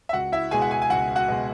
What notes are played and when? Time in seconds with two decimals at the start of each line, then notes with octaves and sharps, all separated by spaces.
0.09 E5
0.13 C#2 F#4 F#5
0.32 E4 E5
0.51 B2 G#3 G#4 G#5
0.62 F#5
0.71 G#4 G#5
0.82 G#5
0.90 C#2 F#4 F#5
1.16 F#4 F#5
1.28 B2 G#3